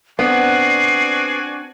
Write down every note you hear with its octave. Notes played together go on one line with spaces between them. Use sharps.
B3 C4 D4 F#4 D5 G#5 C7